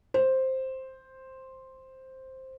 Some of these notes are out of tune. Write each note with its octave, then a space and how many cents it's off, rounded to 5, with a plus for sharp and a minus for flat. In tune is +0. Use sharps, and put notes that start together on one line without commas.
C5 +5